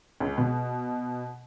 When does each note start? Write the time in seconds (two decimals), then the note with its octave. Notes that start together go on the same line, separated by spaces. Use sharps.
0.20 C#2
0.38 B2